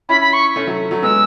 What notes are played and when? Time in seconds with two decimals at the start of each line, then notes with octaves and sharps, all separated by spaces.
0.09 C#4 E4 B5
0.21 B5
0.33 C#6
0.56 A3 C#4
0.67 F#3 A3
0.91 F#3 A3
1.02 G#3 B3 E6